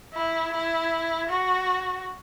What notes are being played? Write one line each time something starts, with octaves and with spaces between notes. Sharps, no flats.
E4
E4
F#4